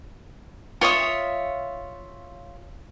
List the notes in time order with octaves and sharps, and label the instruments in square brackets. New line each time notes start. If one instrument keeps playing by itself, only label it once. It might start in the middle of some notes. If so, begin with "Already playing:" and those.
[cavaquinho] F4 C#5 E5 D#6